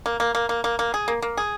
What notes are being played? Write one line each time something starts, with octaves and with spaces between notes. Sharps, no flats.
A#3
A#3
A#3
A#3
A#3
A#3
G#4
A#3
A#3
G#4